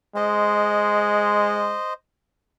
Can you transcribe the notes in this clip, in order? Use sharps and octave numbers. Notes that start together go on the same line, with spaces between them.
G#3 C5 D#5